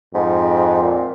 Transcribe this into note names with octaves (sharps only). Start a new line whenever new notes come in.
F2 G#2
A#2